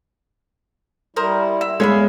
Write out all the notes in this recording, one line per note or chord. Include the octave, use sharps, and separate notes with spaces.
G3 E4 A#4 C5 D#6
E5
E2 G#3 G#4 C#5 E5 F5 B5